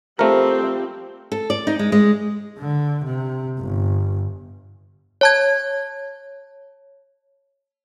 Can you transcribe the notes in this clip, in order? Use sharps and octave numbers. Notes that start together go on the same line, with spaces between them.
F3 G3 A3 C4 G4 A#4
A4
D5
D#4
G#3
G#3
D3
C3
G1
C#5 A5 G#6